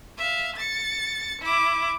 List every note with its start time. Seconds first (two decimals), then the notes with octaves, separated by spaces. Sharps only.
0.17 E5 F5
0.56 A6 C#7
1.41 E4 D6